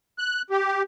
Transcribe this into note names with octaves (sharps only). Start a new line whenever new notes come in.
F#6
G4